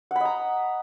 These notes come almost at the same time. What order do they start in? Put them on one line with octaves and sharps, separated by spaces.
F#5 B5 D#5 A#5